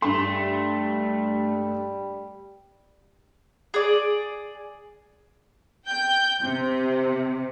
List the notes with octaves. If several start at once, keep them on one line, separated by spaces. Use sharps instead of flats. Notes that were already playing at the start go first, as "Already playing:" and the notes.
G2 A3 C6
G3
G#4 D5
G5 G6
C3